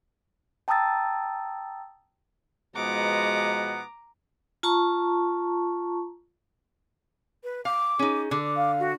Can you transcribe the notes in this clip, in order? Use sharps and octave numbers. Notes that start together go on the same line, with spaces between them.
G5 A5 A#5 D#6 E6 A6
B2 F3 G#3 B3 D#4 F#5 A#5 D6
F4 A5 A#5 C#6
B4
F5 D6
C#4 D#4 G#4
D3 D6
F5
F#4